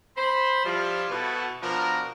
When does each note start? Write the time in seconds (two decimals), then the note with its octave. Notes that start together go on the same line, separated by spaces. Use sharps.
0.17 C5 B5
0.65 F3 G3 E4 F4
1.11 B2 B3 E4 F#4 A4
1.63 B2 F3 D4 A#4